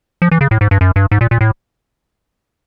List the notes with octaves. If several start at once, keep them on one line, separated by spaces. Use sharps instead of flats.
F3
E3
C#3
A2
G#2
G2
F#2
G2
G#2
A#2
A#2
A2